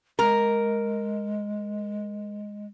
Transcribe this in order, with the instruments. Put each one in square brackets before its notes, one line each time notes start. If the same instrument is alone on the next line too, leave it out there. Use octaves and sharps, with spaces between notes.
[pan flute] G#3 [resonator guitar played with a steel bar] A#4